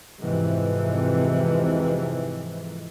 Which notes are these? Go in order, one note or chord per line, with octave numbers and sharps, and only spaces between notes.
F2 G#2 C3 E3